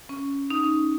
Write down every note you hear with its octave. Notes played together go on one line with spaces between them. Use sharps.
C#4
D#4
C#4